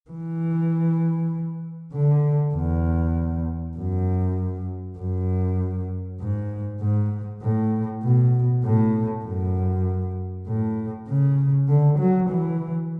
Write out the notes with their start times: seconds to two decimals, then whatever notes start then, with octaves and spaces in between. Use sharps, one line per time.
0.10 E3
1.93 D3
2.54 E2
3.76 F#2
4.98 F#2
6.20 G#2
6.80 G#2
7.42 A2
8.02 B2
8.63 A2
9.24 F#2
10.46 A2
11.08 C#3
11.68 D3
11.99 F#3
12.29 E3